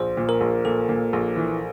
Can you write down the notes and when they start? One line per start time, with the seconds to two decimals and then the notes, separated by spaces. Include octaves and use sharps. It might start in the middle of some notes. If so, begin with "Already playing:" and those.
Already playing: A#1 C5
0.17 A#2
0.29 A#4
0.41 A#1
0.65 A#2 A4
0.89 A#2
1.13 A#1
1.36 E3